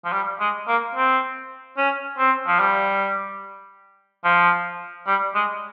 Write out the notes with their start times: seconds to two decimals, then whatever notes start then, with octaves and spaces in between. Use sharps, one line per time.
0.05 F3
0.12 G3
0.40 G#3
0.68 A#3
0.95 C4
1.77 C#4
2.18 C4
2.47 F3
2.59 G3
4.24 F3
5.07 G3
5.34 G#3